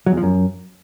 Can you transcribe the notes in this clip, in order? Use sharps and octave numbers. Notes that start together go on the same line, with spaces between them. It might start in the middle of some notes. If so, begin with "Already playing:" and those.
F#3
E2
F3
F#2